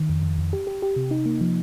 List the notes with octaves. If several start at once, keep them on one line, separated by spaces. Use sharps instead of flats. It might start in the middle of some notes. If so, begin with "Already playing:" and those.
Already playing: D#3
F2
F2
F2
G4
G4
G4
C3
D#4
A#3
F3